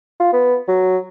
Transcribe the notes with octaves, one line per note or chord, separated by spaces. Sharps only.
F4
B3
F#3